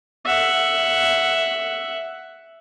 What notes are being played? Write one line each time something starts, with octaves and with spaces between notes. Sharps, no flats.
E5 F#5